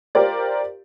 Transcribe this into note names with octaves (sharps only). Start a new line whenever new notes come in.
F4 G4 A#4 C5 D5